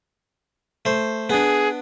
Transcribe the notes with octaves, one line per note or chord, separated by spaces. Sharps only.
A3 C5
B3 D4 G#4